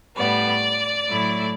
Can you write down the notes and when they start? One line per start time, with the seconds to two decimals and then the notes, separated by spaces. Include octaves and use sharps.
0.16 A2 G3 B3 D5
1.09 A2 F#3 A3 E4